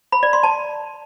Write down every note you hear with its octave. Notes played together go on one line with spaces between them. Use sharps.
B5
D5
C6
A5